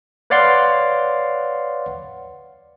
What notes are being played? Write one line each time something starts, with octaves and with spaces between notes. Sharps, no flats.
B4 C#5 D5 F5 F#5 C6